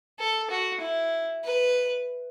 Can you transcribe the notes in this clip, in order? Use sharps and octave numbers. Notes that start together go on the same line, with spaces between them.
A4
F#4
E4
B4